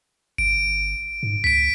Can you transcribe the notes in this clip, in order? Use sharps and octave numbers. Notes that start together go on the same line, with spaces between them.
G1 D7
G#2
C#2 B6 D7